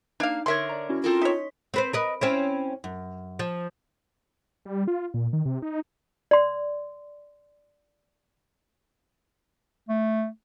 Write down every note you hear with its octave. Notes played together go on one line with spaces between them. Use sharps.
A#3 D4 D#4 F5
D3 A#4 C#5 E5 C6
D5 A#5
C#4 E4 F#4
C4 F4 A4 A#4
D#4 C#5 C6 B6
C4 B4 C5
A#4 B4 D#5
C4 C#4 E4
F#2
F3
G3
F4
A#2
D#3
C3
D#4
D5 C6
A3